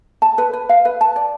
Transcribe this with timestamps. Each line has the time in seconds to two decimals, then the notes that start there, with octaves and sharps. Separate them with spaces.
0.22 A5
0.38 B4
0.53 B4
0.69 F5
0.85 B4
1.01 A5
1.16 D5